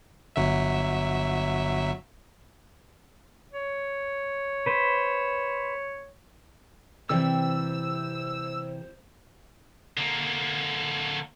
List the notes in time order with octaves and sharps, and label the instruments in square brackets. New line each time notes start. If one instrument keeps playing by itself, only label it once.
[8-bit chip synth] G1 F#3 E5
[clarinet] C#5
[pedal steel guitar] B4 C5
[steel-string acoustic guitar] C3 E3 G3 [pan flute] C5 [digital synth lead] E6
[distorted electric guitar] D3 A#3